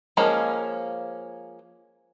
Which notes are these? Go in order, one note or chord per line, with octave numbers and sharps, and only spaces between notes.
F3 G#3 A#3 C#4